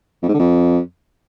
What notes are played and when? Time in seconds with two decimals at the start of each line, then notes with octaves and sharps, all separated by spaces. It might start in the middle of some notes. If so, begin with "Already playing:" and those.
0.22 F2
0.28 G#2
0.34 D3
0.39 F2